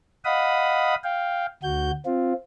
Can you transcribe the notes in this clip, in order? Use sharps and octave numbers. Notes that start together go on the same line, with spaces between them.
D#5 F5 F#5 B5 D#6
F5 G5
D2 F#4 G6
C4 F4